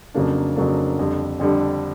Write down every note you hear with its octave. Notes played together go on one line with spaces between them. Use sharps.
F2 C#3 F#3 A#3 D4
F2 C#3 F#3 A#3 D4
F2 D3 G3
F2 D3 G3